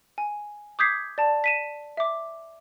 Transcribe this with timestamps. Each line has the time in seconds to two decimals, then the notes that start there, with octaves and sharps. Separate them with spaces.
0.18 G#5
0.79 D6 D#6 G6 G#6 B6 C7
1.18 D5 A5
1.44 B6 D#7 E7
1.97 E5 D6